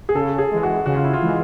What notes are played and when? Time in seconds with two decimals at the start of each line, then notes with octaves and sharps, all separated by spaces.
0.09 G#4
0.15 C#3 A4
0.38 G#4
0.51 E3 G#3
0.63 F#4
0.86 C#3 F#4
0.96 F4
1.04 E4
1.13 F4
1.22 E3 G#3